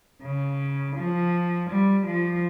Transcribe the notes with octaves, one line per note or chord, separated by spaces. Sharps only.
C#3
F3
G3
F3